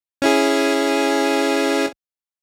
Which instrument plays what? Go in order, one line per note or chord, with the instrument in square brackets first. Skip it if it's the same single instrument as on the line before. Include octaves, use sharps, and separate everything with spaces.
[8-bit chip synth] C#4 E4 G#4